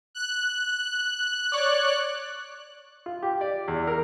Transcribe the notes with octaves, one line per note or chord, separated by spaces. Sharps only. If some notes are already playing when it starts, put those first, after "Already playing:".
F#6
C#5 D5
F4
G4
D5
E2
A#4